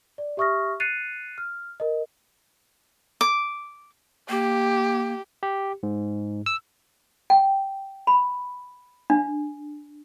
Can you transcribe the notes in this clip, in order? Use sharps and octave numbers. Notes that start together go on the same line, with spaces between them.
D5
G4 E5 C#6 D#6 F6 A#6
F#6 A6 C7 C#7 D#7 F7
F6
A#4 D#5
D6
A#3 G4
G4
G#2
E6
G5
B5
D4